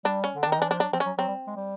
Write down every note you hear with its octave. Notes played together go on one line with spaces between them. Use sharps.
G3 D4
C#4
D3
D4
D#3
D#4
E3 D4
F3 D4
F#3 D4
F3 C4
C#4
F#3
F#3 C4
G3
G#3
G3